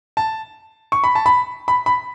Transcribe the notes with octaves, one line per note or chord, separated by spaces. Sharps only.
A5
C#6
B5
A5
B5
B5
B5